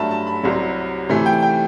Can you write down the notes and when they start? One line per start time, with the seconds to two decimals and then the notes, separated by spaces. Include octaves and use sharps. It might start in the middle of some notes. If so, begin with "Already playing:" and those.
Already playing: G2 F#3 A3 E5 A5 B5
0.11 A5
0.27 B5
0.43 C2 C3 F#3
1.09 C3 E3 A3
1.26 G5
1.43 G5